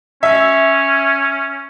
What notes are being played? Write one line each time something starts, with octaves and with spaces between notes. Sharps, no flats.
C#4 E5